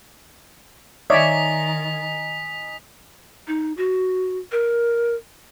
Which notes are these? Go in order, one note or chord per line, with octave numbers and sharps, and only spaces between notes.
D#3 D#4 C#5 D5 E5 G#5 D#6 B6
D#4
F#4
A#4